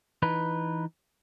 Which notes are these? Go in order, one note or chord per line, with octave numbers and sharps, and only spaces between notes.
E3 D#4 B4